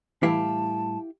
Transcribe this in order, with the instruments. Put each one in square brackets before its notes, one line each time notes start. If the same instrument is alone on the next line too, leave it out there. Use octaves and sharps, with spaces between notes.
[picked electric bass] A2 G3 A3 [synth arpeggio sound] E3 [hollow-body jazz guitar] E4 G4 F5 [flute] A5